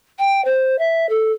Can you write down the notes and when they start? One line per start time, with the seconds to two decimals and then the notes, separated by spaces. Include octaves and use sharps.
0.19 G5
0.44 C5
0.78 E5
1.09 A4